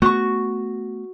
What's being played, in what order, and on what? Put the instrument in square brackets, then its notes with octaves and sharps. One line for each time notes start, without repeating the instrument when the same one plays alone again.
[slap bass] A3 B3 [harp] F#4 C#6